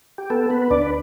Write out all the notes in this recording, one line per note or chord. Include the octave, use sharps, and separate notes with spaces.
G4
B3 A4
B3 B4
B4
D2 D4 D5
B4